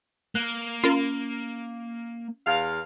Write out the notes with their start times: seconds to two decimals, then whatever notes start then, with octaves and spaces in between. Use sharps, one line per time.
0.35 A#3 F#6
0.84 C#4 F4 A#4
2.47 E2 F5